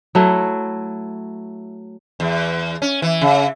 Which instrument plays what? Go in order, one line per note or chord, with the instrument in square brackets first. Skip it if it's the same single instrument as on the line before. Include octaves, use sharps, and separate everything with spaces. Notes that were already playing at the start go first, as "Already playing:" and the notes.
[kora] F#3 A3 E4
[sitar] E2
C#4
E3
C#3